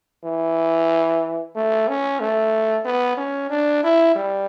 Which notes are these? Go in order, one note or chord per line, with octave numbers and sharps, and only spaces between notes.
E3
A3
C#4
A3
B3
C#4
D4
E4
G3